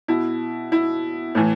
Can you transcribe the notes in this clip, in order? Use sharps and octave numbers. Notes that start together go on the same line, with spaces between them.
B2 E4
E4
A2 E3